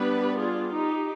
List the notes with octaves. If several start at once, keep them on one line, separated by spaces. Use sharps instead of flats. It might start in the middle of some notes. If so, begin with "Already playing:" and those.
Already playing: G3 B3 D4 G4 B4
F4 G#4
D#4 G4